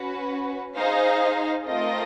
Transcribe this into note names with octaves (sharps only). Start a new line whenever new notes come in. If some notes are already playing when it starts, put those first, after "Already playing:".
Already playing: C#4 F#4 B4
D#4 G#4 C5 F5
A3 C4 F4 A#4 D#5